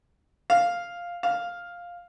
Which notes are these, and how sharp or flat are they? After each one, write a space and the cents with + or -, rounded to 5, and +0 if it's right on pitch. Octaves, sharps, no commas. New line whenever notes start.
F5 +0
F5 +5